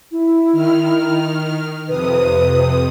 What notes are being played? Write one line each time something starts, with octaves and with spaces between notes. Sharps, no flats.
E4
D#3 F6
F2 C3 B4 D#6